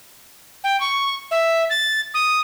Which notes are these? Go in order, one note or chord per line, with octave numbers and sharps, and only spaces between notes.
G5
C#6
E5
A6
D#6